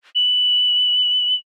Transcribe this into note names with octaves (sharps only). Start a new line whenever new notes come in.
F#7